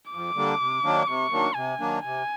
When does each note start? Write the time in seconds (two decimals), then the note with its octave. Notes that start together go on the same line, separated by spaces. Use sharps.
0.11 F2 D6
0.35 D3 G3 A#3 D4
0.60 C3
0.83 D#3 F#3 A#3 D4
1.08 C3 C#6
1.31 D#3 F#3 A#3 D4
1.55 C3 G#5
1.80 D#3 F#3 A#3 D4
2.03 C3 G#5